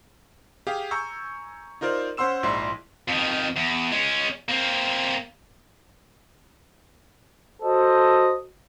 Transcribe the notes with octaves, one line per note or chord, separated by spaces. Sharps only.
G4 G#4 F5
G#5 A#5 C#6 E6 G6
D#4 F4 A#4 C5 D5
C#4 C5 F#5 C6 E6 E7
A#1 G#2 E4 D5 C6
F2 D#3
E2
G#3 C#4
A#3 C4
F#4 A4 C5 D#5